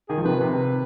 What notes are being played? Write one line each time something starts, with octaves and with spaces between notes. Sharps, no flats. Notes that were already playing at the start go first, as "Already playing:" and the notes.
D#3 G#4
F3
C3 D#3 B4
C3 B4